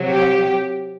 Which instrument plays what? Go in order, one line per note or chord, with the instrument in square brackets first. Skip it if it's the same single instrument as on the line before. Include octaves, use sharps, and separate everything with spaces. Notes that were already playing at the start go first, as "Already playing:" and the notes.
Already playing: [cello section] C3 F#3
G4